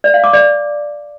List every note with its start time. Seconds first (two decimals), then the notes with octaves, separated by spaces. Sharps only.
0.04 D5
0.14 F5
0.24 D6
0.33 D5